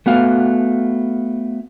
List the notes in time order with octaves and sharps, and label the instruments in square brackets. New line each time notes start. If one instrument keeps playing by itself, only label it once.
[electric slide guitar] A3 B3 F#4 F5